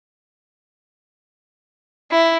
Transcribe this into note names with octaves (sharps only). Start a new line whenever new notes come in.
E4